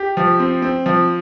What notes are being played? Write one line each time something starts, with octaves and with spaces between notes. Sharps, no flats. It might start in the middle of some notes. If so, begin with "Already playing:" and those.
Already playing: G4
F3
C4
C4
F3